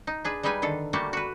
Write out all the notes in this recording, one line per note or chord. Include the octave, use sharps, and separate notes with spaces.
D#4
D4 G#4 B4
G3 G#3 D#4 B4 G#5
D3 D#3 A4
G3 A3 A#3 D4 F#4 G4
F#4 B4